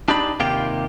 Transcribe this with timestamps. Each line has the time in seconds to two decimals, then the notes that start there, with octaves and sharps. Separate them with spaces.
0.08 D4 D#4 G4 D5 B5
0.40 D#2 C3 A#3 F4 G4 G5